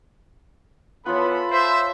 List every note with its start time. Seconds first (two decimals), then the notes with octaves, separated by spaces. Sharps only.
1.06 E3 B3 F4 A4 C#5 A5 B5
1.52 C5 E5